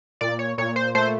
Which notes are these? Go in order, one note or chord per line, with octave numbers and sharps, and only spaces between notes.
A#2 D5
C#5
A#2 C#5
C5
A3 C5